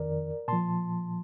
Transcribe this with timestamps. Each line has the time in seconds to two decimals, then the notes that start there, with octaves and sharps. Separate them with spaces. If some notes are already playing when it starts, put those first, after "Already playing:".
Already playing: F2 D#3 A#4 D5
0.48 A#2 F3 A5 C6